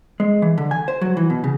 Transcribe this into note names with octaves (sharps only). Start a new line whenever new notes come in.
G#3
E3
D3
G#5
C5
F#3
E3
B2
C#3